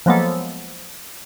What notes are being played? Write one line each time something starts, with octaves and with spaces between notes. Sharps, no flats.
F3 F#3 G#3 A#3 B3 A4